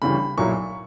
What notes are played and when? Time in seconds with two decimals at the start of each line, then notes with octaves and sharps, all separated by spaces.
0.02 D2 C#3 E3 G3 B5
0.38 B1 A#2 F#3 A#3 E4 C#6